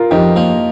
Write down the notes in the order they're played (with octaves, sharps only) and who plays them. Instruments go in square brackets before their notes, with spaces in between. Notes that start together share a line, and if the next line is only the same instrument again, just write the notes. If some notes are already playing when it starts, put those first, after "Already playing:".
Already playing: [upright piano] F4 A#4
[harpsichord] F2 [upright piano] D#4 G4
[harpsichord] F3 [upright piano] A#3